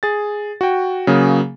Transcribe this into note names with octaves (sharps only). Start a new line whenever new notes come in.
G#4 A6
F#4 G5
C#3 F#3 A#3 G#4